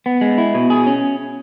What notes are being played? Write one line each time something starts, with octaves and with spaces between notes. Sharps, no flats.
B3
G#3
E4
B2
G#4
C#4